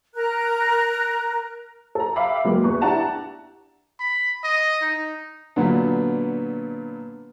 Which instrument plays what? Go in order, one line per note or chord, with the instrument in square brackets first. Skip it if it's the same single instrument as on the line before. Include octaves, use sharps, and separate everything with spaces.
[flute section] A#4 A#5 F#6
[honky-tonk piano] A4 A#5
E5 F5 G5 B5 D6
F#3 G#3 A#3 B3
E2 B4 C#6
D4 E4 G4 F#5 A5 A#5
[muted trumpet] B5
D#5
D#4
[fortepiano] A#2 D3 F#3 B3